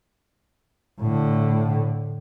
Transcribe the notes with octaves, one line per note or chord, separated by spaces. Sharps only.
A2 D3